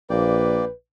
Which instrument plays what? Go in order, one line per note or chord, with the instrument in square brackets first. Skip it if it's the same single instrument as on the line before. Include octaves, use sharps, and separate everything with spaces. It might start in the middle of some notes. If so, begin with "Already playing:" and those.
[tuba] A#1 [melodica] A#3 D5 G5 [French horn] B4